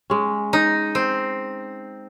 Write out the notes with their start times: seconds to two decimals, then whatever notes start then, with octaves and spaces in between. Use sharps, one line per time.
0.10 G#3 C#4
0.53 D#4
0.95 C4